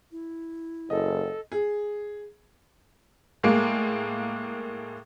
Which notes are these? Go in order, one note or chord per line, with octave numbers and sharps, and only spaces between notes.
E4
F#1 A4 D#5
G#4
A2 G#3 A#3